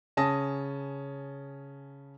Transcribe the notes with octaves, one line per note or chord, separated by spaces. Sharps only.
C#3 C#4 A5 D#6 A#6